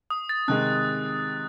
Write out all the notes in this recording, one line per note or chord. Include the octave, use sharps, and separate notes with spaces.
D#6
A6
C3 D#3 G#3 F#6
F#6